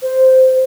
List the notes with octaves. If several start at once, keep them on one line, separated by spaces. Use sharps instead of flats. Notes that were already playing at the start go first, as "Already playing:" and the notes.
C5